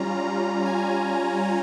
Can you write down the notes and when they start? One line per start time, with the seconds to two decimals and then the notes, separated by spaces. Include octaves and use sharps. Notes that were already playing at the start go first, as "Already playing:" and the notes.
Already playing: G3 C#4 F4 A#5
0.66 G#5